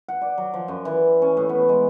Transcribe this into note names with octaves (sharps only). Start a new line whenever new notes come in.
F#5
D5
F#3
F3
F#2
E3
C#4
A2
B3
G#3